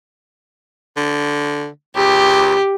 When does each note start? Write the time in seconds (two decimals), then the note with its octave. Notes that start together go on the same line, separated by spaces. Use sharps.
0.97 D3
1.96 C#2 G4